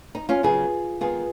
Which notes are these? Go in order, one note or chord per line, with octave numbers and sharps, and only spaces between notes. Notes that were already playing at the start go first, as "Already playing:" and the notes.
D#4
C#4 F4
C#3 F#3 B3 F4 G#4
D#3 G#3 B3 F4 G#4